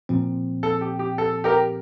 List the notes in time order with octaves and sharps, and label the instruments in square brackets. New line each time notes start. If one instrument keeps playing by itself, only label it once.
[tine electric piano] A#2 F3 C4
[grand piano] A4
G4
G4
A4
G4 A#4